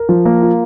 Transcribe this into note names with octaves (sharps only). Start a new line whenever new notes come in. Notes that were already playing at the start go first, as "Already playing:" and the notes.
Already playing: A#4
F3
A#3
F4